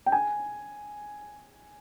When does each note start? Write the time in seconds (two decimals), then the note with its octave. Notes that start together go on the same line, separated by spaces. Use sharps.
0.06 G5
0.12 G#5